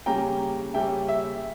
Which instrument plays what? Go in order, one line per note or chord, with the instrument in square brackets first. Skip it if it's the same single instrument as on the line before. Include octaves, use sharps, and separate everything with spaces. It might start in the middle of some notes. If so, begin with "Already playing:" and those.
[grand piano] C#3 G3 A#3 C#4 G5 A#5
C#3 G3 A#3 C#4 E5 G5
E5